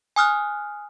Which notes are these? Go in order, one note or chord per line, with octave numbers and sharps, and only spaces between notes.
G#5 D#6 F6 F#6